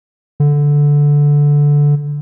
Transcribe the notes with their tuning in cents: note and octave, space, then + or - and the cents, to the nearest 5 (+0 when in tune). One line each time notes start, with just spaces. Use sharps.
D3 -10